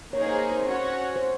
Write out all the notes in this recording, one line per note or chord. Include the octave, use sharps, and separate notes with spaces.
A#3 D#4 G#4 C#5
C5
C5
C#4 F#4 C#5 F#5
C5